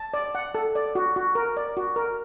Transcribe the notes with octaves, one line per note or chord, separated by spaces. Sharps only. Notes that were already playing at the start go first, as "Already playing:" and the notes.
Already playing: A5
D5
F#5
A4
D5
F#4
F#4
A#4
D5
F#4
A#4